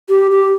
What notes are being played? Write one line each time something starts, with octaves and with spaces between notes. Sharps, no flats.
G4
G4